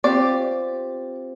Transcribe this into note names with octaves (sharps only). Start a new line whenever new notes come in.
C4 F4 G4 D5